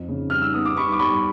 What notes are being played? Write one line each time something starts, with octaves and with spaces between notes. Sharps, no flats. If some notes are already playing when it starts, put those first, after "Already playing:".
Already playing: F2
C#3
G3 F6
E6
B3 D#6
D6
G3 B5 C#6
D6
G3 B5 C#6